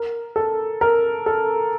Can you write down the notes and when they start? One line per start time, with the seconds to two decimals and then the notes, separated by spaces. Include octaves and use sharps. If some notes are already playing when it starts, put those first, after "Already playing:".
Already playing: A#4
0.36 A4
0.81 A#4
1.26 A4